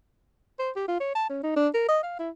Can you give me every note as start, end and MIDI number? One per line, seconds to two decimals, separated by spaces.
0.59 0.71 72
0.76 0.87 67
0.88 0.98 65
1.00 1.11 73
1.15 1.25 81
1.30 1.43 61
1.44 1.53 63
1.56 1.68 62
1.74 1.86 70
1.89 1.99 75
2.03 2.19 77
2.19 2.30 64